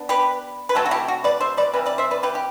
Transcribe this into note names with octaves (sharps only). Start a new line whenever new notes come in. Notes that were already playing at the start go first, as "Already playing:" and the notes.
Already playing: B3 D4
G4 B4
B4
C3 F#3 A3 A4
F#4
E4 G4
F#4
B4 D5
C5 E5
B4 D5
C3 E3 G3 B4
B4 D5
C5 E5
B4 D5
G4 B4
G4